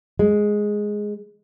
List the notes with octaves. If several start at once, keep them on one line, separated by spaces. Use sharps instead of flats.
G#3